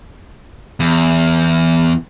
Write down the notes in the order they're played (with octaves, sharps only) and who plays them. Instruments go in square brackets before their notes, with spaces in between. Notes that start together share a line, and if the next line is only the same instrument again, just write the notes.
[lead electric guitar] E2